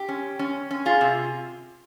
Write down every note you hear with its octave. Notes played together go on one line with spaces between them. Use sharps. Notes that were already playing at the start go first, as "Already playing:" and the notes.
Already playing: G4
C#4
C#4
C#4
F4 G#4
C3